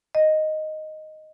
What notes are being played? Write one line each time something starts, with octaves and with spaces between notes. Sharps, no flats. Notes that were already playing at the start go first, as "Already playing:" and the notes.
D#5